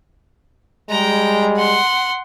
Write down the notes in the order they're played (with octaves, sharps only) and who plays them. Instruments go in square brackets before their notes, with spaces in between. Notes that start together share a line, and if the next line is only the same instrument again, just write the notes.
[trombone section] G3 G#3 [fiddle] G5 A#5
[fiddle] F#5 C6